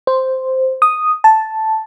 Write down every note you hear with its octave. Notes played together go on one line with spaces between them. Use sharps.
C5
D#6
A5